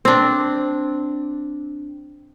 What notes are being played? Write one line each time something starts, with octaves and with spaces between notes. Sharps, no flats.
C4 D4